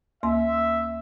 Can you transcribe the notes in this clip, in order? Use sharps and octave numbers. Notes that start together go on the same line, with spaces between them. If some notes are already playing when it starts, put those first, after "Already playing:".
D2 A#3 E5 C6